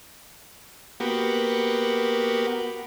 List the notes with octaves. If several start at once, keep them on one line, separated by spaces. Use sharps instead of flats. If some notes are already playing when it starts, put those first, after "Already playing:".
A#3 B3 F#4 G4